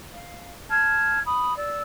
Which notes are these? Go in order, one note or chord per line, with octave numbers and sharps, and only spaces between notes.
F5
A5 F6 G#6
B5 D#6
D5 E6